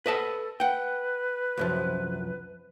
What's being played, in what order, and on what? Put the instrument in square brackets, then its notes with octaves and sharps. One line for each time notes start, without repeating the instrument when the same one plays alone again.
[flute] A4 [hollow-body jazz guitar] B4 D#5 A5
[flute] B4 [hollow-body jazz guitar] F#5 G5
[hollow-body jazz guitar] C2 F#2 F3